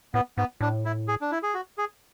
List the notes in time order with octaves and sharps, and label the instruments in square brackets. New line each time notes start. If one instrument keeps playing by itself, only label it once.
[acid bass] A2 [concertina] B3
[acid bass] G#2 [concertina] B3
[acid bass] A2 [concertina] D4
[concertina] E4
G#4
D4
E4
G#4
F#4
G#4